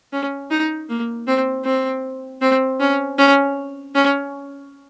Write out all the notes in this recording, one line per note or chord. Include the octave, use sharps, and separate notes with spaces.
C#4
D#4
A#3
C4
C4
C4
C#4
C#4
C#4